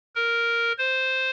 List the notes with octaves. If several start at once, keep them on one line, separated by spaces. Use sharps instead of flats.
A#4
C5